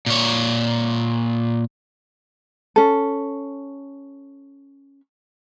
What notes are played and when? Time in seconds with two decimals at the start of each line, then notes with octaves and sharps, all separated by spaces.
0.06 A#2 C#5
2.76 C#4 A4